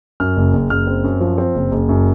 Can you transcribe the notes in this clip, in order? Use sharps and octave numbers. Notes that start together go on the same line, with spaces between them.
F#2 F6
F#1
F#1
F#1 F6
C4
F#2
F3
C4
F#1
F#1
F#2